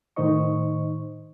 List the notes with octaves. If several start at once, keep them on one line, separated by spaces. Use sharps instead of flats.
A2 D#3 D#4 C5 D#5 C#6